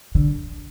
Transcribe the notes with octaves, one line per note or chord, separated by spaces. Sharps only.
D3